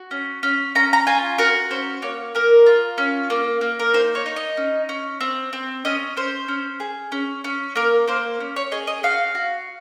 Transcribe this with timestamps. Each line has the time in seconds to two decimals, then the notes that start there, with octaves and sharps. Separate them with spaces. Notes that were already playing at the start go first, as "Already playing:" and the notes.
Already playing: F#4
0.11 C#4
0.43 C#4
0.75 C#4 A#5
0.93 A#5
1.07 F4 G#5
1.38 F#4 A#4
1.71 C#4 C5
2.02 A#3 C#5
2.35 A#3 A#4
2.66 F4
2.98 C#4
3.30 A#3
3.61 A#3
3.79 A#4
3.93 D#4 C5
4.15 C#5
4.26 D#4
4.36 D#5
4.57 C#4
4.89 C#4
5.21 C4
5.53 C4
5.85 C#4 D#5
6.17 C#4 C5
6.48 C#4
6.80 G#4
7.12 C#4
7.44 C#4
7.75 A#3 A#4
8.07 A#3 C5
8.40 C#4
8.56 C#5
8.71 G#4 D#5
8.87 D#5
9.03 F#4 F5
9.35 F#4